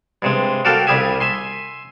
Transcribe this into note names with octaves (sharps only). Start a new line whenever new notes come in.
G2 C3 G#3
F#4 A4 A#4 D5 F5 G5
C2 G3 G4 G#4 E5 G#5
E5 G#5 C6